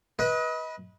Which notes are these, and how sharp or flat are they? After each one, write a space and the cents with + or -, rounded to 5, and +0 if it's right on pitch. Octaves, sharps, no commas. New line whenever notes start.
B4 -15 D#5 +30